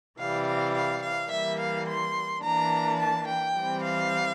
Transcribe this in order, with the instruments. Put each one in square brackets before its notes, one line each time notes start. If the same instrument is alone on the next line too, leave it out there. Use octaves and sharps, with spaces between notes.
[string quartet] C3 E3 G3 F5
F5
F5
F5
E3 G3 A#3 E5
F5
C6
E3 A#3 D4 A#5
A5
G5
E3 G3 C4
F5